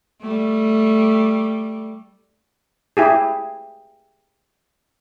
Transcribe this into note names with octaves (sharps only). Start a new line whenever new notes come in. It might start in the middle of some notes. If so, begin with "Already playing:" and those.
G3 A3
E4 G4 G#4